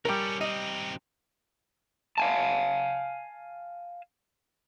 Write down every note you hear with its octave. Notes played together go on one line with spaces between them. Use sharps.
G3 C#4 A4 A#4 G5 A#5
C4 D#4 D#5
F5 G#5 A5